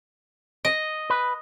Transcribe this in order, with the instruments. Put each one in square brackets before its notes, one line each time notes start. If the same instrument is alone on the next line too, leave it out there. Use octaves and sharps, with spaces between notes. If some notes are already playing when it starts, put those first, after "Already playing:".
[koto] D#5
[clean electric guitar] B4